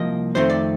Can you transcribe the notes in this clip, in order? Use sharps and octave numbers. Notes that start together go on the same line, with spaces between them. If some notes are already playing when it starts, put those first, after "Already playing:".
Already playing: C2 F3 A#3 D#5
F2 D#3 A3 C4 C5
D5